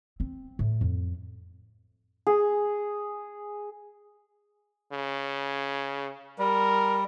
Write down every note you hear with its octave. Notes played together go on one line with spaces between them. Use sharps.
C4
A2
F2
G#4
C#3
G3 A#4